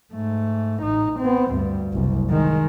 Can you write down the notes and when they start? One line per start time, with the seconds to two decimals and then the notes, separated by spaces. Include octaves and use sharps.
0.13 G#2 A3
0.82 A1 D#4
1.19 B3 C4
1.52 D2 G2
1.93 F#1 C2
2.30 D#3 G#3